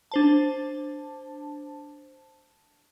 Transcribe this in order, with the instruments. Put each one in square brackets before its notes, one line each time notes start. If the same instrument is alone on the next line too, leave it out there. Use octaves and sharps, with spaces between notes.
[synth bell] D4 C5 A5